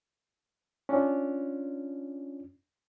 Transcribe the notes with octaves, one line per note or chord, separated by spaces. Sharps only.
C#4 D4 F4